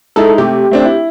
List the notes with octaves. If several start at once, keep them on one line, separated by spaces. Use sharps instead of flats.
G#3 D#4 E4 A4
C3 A3 G4
A3 C4 D4
E4